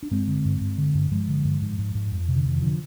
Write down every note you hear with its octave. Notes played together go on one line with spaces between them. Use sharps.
D4
G2 G#3 C4
D3
G2
G2
D3
G2
G2 F3 G#3
D3
G2
G#2
G#2
G#2
F2
C3
D3
F2 D#3
D3 F3